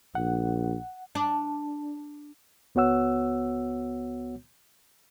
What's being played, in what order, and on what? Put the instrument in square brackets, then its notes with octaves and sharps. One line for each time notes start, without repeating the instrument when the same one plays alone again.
[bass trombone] A#1 [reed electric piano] F#5
[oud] D4
[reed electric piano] C#2 B3 F#4 C#5 F#5 E6